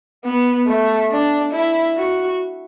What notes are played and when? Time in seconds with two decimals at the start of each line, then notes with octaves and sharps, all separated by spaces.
0.25 B3
0.67 A3
1.11 D4
1.53 E4
1.98 F#4